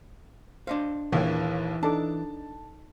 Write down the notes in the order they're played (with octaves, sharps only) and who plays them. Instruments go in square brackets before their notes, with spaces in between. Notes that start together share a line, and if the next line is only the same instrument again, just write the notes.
[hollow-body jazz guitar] D4 D#5 F5 [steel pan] C5
[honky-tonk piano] A#1 D#2 A#3 [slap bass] E3 [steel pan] C#5
[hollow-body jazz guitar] D4 [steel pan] D#4 A4 D6 [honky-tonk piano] A5